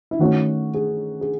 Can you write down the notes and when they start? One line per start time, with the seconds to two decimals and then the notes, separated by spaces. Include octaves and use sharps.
0.11 E4
0.19 D#3 A3 C#4 F#4
0.74 G#4
1.21 G#4